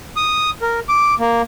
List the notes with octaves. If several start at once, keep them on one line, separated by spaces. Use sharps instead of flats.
D#6
A#4
D6
A#3